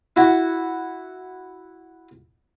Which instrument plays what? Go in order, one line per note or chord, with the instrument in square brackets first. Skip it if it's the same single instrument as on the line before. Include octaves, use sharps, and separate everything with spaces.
[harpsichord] E4 F#4